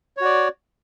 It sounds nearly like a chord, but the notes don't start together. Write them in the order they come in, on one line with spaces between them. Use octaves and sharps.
C#5 F#4 D5